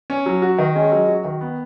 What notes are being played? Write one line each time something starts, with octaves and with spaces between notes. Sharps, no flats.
C#4
F#3
F#4
D#3
G#3 C#4
F#3
F#4
D#3
B3